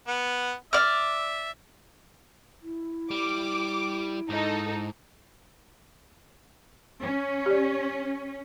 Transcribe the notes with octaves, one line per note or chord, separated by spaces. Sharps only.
B3 F#5
D5 E5 F6
E4
G3 D6
G#2 D#4 A4
C#4
G4 D5